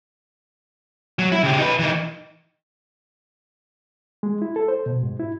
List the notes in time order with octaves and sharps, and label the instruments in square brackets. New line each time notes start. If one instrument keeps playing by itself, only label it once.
[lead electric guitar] F#3
E4
C#3 G4
D#4 B4
E3 D#4
[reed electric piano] G#3
E4
A4
C5
B2
G#2
E4